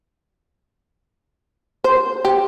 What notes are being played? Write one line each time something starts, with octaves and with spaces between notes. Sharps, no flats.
C5
G4